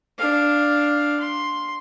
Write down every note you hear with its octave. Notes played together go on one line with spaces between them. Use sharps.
D4 F5
C6